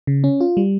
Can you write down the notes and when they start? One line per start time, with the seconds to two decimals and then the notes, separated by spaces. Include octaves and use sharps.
0.07 C#3
0.24 C#4
0.41 F4
0.57 G3